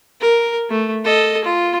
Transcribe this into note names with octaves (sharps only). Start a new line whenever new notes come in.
A#4
A3
A4 D#5
F4